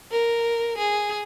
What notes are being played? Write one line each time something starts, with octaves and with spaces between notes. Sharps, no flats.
A#4
G#4